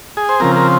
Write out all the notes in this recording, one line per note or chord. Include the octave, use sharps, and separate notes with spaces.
G#4
C5
C#3 F3 C4 A#4
A#4